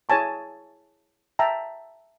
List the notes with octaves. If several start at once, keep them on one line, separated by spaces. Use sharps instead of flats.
E4 G#4 C#5 G#5 A5 C#6
E5 G5 A5 A#5